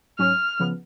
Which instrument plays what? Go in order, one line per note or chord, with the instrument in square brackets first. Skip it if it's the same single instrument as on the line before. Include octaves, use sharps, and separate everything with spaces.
[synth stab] G#2 F#3 C#4 [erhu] F6
[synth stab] C#3 F3 B3